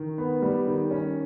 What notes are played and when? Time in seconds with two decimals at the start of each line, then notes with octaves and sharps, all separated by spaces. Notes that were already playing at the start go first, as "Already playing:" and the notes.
Already playing: D#3
0.18 B3
0.42 G3
0.67 D#3
0.91 C#4